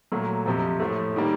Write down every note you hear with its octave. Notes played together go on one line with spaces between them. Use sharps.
A#2 F#3 A3
F2 C3 F3
A2 F3 A3
D#3 G3 A#3